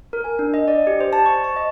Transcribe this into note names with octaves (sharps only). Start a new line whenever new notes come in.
A#4
G#5
D4
D#5
D5
G4
C5
A5
C#6
A5
D#5